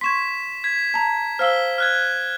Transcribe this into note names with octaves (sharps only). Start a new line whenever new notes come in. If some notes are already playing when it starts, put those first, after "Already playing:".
C6 C#6 G#6 B6 E7
G#6 B6
A5 A#5
C5 F5 E6 F6 B6 G7
F6 F#6 G#6